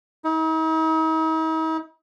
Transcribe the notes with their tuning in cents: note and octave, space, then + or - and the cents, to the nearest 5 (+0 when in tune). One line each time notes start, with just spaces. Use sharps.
D#4 +45